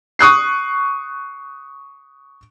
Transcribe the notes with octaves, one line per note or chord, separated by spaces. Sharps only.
C#6 D#6 F#6 C7